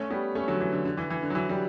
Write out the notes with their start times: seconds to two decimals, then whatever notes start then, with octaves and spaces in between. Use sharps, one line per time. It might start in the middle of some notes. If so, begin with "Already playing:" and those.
Already playing: A3 C#4
0.10 G3 B3
0.35 A3 C#4
0.48 D3 F#3
0.60 E3
0.73 D3
0.85 D3
0.97 E3
1.10 E3
1.22 D3
1.30 F#3
1.35 E3
1.49 G3